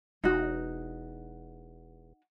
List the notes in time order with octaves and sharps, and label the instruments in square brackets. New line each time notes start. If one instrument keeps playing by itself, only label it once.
[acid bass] E1 [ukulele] D#4 F#4